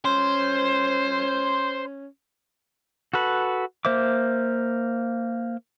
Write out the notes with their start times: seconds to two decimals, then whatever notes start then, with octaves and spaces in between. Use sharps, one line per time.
0.05 C#4 C5
3.13 F#4 A4 B4
3.85 A#3 C5 E5 D6